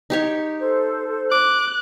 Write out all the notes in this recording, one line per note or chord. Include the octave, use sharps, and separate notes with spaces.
D#4 G4 C#5
A4 C5
D6 F#6